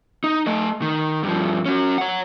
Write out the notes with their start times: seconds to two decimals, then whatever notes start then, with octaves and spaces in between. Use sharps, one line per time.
0.24 D#4
0.47 A3 D#5
0.82 D#3
1.23 G2 F3
1.66 C#4 F#4
1.98 C#5 F#5